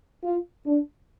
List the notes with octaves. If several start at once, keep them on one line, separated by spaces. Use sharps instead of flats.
F4
D4